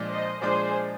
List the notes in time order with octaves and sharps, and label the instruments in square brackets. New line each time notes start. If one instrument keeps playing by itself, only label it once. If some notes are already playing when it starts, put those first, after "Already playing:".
Already playing: [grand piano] A#2 F3 G#3 D4
[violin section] C5 D#5
[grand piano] A#2 F3 G#3 D4 [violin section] G#4 C5